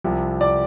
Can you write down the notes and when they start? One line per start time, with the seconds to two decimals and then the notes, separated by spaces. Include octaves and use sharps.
0.04 C2 C3 F3
0.41 D5 D6